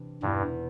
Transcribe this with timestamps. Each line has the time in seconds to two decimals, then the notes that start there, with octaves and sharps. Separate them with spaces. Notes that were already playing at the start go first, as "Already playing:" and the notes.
Already playing: C3 E3 D4
0.22 E2 G2 B2 B3 E4